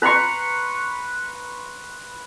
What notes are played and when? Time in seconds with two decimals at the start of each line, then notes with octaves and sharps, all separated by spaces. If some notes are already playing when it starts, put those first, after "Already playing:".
0.02 B4 A#5 C6 C#6